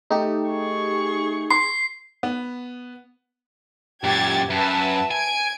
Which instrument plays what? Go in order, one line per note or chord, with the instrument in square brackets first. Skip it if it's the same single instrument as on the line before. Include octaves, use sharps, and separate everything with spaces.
[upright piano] A3 [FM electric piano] D#4 G4
[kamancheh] G#4 C#6
[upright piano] C6 [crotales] C7
[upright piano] B3
[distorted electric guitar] F#2 A#2 [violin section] G4 G#6 A6
[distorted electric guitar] F#2 [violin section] B4 E5 A5
[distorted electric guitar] G#5 [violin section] G#6 D7